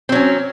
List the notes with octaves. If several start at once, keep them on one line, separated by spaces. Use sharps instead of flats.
F#3 C4 C#4